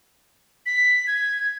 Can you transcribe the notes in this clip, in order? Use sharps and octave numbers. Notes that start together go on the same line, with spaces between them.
B6
G#6